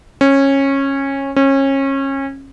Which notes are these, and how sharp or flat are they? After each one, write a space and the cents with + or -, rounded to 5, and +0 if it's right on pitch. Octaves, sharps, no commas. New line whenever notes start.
C#4 -20
C#4 -30